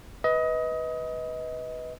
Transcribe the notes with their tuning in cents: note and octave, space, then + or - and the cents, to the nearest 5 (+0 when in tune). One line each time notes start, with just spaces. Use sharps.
B4 +0 D#5 +25